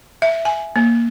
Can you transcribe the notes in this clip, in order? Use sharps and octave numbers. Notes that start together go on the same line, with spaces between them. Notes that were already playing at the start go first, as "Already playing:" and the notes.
E5
G#5
A#3